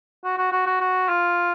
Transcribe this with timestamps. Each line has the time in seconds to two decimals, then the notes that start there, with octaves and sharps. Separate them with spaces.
0.24 F#4
0.38 F#4
0.52 F#4
0.66 F#4
0.81 F#4
1.08 F4